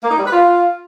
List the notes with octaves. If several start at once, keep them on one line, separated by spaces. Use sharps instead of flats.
A#3
D#4
G3
B4
F4